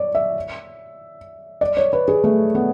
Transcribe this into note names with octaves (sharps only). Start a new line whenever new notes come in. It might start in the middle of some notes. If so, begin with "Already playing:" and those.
Already playing: C#5 D5
E5
D5
C#5
B4
G#4
A3
B3